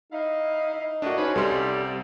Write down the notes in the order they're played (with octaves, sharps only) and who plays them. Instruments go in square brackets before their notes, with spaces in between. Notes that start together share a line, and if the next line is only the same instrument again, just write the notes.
[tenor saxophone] D#4 [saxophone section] E4 F5
[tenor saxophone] D#4
[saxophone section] A2 A#3 D#5 [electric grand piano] D4 F#4
[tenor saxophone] C#4 [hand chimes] D#4 [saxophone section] B4 C5
[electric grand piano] C2 C6 [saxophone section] G3 [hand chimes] A4
[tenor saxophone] C3